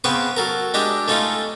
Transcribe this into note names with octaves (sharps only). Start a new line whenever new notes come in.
C#3 B3 C4 B4 C#6 D#6
F#3 A4 A#4
G#3 D4 G4 D#5 E5
A3 C#4 D#4 F4 A4